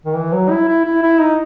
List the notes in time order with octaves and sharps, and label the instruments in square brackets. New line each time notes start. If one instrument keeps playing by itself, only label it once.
[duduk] D#3
E3
F#3
E4
E4
E4
E4
D#4